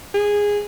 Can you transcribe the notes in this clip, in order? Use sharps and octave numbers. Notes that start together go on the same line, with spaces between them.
G#4